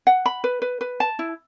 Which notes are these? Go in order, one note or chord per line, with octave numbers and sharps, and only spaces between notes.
F#5
B5
B4
B4
B4
A5
E4